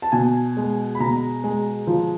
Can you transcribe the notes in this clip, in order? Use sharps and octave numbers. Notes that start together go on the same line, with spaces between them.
A5
B2 G#5
G#3
B5
B2 A#5
G#3
F3